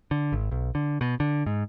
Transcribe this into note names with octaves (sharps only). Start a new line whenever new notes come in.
D3
G#1
B1
D3
B2
D3
G#2